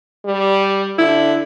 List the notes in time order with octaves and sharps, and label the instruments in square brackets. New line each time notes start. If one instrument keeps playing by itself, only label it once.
[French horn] G3
[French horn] D3 [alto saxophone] E4